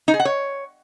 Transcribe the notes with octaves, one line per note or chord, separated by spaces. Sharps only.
D#4
G#4
F#5
C#5